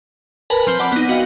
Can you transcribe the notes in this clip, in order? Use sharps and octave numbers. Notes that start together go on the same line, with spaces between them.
A#4 B4 G#5 A5 B5
F3 C4 G7
D5 F#5 B5 D6
B3 D#4
F#4 D#5 F5 G5